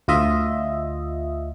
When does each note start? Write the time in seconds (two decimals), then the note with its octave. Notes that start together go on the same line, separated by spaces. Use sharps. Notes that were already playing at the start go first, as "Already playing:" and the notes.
0.08 D2 F4 D#5 E5